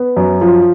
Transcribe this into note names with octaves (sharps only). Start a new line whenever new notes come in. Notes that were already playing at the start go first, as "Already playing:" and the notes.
Already playing: B3
F#2
F3